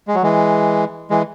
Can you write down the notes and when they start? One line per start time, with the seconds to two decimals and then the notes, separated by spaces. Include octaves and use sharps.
0.08 G#3
0.15 F#3
0.23 E3 G#3
1.10 E3 G#3